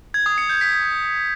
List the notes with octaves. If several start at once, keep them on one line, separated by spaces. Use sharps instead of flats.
G#6
D#6
C#7
G6
B6